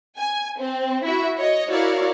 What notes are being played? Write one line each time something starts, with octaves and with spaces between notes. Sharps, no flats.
G#5
C4
E4 F#4 E5
C#5 D#5
E4 F#4 A#4 C#5 D5 F5